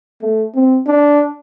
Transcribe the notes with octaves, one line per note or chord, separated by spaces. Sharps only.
A3
C4
D4